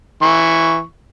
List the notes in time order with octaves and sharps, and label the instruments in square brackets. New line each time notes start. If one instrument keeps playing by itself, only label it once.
[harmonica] E3 C#6